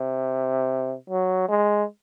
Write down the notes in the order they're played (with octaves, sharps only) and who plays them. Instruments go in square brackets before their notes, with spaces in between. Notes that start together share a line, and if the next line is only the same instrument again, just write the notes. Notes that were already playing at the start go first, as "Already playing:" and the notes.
Already playing: [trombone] C3
F#3
G#3